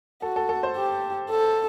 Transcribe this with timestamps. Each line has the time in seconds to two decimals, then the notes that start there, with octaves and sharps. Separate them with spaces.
0.22 F#4 A4
0.36 A4
0.49 A4
0.63 C5
0.76 G4
1.30 A4